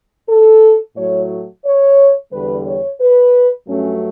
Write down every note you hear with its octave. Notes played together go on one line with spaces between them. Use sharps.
A4
A2 F#3 A3 C#5
C#5
E2 D3 G3 B4
C#5
B4
G2 F#3 A3 C#4